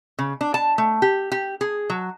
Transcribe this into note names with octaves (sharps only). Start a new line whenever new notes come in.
C#3
D4
A5
A3
G4
G4
G#4
F#3